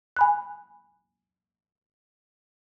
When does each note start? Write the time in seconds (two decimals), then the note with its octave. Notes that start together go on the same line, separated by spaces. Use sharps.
0.17 G#5 B5 F#6